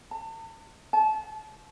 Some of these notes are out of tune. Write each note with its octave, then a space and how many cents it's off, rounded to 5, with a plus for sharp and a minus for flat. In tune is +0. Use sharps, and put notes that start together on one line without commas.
A5 +40
A5 -30